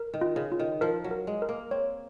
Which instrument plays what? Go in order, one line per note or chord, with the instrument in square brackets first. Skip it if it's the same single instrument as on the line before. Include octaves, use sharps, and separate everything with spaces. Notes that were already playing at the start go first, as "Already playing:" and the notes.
Already playing: [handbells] A#4
[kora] D#3
[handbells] F4
[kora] C#3
[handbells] F4
[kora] D#3
[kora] F3 [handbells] A#4
[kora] F#3
[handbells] A#4
[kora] G#3
[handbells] A#4
[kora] A#3
[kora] C4 [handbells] C#5